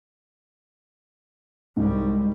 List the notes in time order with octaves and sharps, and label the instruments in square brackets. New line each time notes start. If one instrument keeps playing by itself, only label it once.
[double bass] C2 G3 [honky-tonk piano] G#2